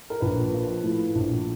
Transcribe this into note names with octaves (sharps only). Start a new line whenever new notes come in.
A#4
A#1 B4
F3
A2
A#1